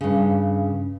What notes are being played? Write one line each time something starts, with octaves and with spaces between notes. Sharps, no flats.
G2 C#3